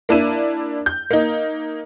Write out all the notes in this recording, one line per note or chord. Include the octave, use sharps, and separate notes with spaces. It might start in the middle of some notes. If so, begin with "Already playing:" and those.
A#3 D4 E4 D#7
G6
A#3 D#4